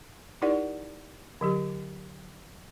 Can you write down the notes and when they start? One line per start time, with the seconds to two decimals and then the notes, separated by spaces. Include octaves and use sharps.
0.42 D#4 E4 G4 A#4 D5 F#5
1.41 D3 F#3 G4